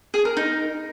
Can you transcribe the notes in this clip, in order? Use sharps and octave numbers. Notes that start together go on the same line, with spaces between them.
G#4
A#4
D#4